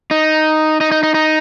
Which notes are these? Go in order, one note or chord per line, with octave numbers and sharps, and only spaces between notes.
D#4
D#4
D#4
D#4
D#4